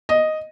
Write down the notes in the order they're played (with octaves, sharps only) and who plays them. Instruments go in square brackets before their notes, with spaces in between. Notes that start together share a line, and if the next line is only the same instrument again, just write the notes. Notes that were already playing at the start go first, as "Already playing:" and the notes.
[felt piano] D#5